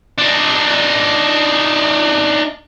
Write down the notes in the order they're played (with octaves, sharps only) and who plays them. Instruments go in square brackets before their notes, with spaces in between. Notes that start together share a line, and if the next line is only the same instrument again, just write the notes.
[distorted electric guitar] D4 D#4